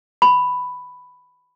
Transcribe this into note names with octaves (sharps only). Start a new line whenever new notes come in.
B5